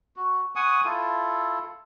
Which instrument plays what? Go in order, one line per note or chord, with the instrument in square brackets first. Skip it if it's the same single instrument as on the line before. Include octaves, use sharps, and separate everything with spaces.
[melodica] F#4
F#5 G#5 C#6 D#6
E4 F4 A4